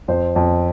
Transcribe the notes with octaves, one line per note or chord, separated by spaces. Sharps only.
F2 C5
F2